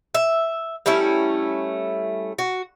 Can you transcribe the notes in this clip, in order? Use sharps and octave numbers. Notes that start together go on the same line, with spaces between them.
E5
G3 A3 C#4 E4
F#4